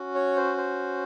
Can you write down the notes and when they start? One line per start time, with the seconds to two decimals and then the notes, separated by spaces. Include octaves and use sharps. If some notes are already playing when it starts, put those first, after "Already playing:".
Already playing: C#4 F#4
0.15 C#5
0.36 C5
0.57 C5